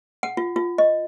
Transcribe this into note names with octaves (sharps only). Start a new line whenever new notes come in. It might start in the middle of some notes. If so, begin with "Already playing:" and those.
F#5
F4
F4
D#5